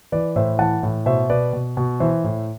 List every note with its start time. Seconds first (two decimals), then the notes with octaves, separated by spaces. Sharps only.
0.12 E3 B4 D5
0.36 A2 C5 E5
0.59 E3 F#5 A5
0.83 A2
1.06 B2 C5 E5
1.30 B2 B4 D5
1.53 B2
1.77 B2
2.00 E3 C5 E5
2.24 A2